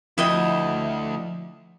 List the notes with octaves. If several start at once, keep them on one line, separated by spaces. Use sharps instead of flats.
D2 F3 E4 D#5 G5